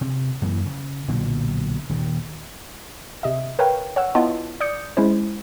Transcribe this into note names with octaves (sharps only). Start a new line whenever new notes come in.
C3
F#2 E3 A#3
C#3
B1 A#2 D3 F#3
D#1 D#2
C3 D#5 E5
A#4 B4 C#5 F5 G5
C#5 F#5 E6
B3 E4 F4 D#5 A5
D5 D#6 G6 C#7
G#3 C#4 E4 C5